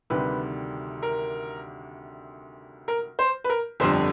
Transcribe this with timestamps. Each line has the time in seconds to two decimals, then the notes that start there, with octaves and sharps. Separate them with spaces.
0.10 D2 C3 D#3 G3 B4
1.02 A#4
2.88 A#4
3.19 C5
3.44 B4
3.49 A#4
3.80 G1 F2 D3 G3 C5